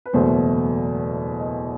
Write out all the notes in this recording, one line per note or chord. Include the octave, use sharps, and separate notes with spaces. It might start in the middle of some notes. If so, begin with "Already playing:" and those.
B4
F#1 E2 B2 A3 C5
D#5